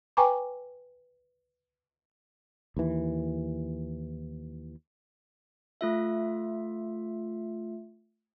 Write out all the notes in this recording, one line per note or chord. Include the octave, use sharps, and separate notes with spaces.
B4 G5 G#5 A#5 C#6 D6
D#2 E3
A3 F4 E5